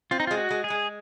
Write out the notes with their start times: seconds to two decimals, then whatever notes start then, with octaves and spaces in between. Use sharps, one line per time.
0.11 C4 F4
0.20 D#4
0.27 G#3 F4
0.37 F#4
0.50 G#3
0.64 G#4
0.70 G#3